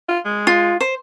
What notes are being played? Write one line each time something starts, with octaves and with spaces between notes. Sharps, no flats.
F4
G#3
F4
C5